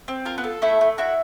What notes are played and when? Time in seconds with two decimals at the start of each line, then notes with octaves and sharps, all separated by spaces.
0.08 C4
0.25 F4 A#4
0.38 B3 B4
0.44 A4
0.62 A3 E4 E5
0.81 A3
0.98 E4 F#4 E5